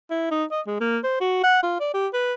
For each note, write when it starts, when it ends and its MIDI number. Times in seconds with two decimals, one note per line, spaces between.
0.10 0.27 64
0.31 0.44 63
0.51 0.61 75
0.67 0.80 56
0.81 0.98 58
1.03 1.19 72
1.20 1.40 66
1.43 1.60 78
1.63 1.76 65
1.80 1.90 74
1.94 2.07 67
2.13 2.33 71